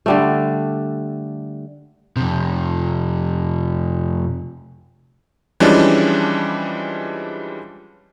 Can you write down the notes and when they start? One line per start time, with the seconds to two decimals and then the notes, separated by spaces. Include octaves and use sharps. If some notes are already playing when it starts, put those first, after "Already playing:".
0.06 D3 G3 A3
2.16 F2 C3
5.60 E3 F3 G3 G#3 C#4 D4